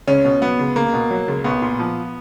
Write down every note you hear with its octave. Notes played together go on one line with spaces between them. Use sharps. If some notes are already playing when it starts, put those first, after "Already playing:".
C#2 C#4
B2
F#3 B3
C#2
C#2 A#3
B2
F#3
C#2
B1 B3
A#2
F3